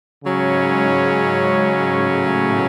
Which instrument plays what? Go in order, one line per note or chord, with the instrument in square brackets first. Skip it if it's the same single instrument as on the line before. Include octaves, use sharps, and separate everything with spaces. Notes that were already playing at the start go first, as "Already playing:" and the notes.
[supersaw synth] G#2 G#3 [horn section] C#3 F#3 C#4
[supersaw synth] A2 A3
B2 B3